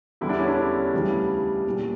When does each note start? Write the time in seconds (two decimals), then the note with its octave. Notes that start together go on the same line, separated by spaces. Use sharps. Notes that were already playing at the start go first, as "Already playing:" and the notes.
0.21 E2 D3 G3 E4
0.29 D4
0.39 C#4
0.48 D4
0.93 D2 C#3 E3 G3
1.66 A#2 G3